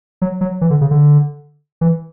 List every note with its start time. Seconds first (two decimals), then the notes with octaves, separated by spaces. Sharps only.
0.22 F#3
0.41 F#3
0.61 E3
0.70 D3
0.81 C#3
0.91 D3
1.81 E3